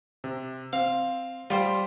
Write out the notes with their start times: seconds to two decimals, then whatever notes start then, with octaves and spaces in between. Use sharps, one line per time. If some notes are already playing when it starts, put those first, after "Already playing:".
0.24 C3
0.73 C4 F5
1.50 G3 F4 G4 C5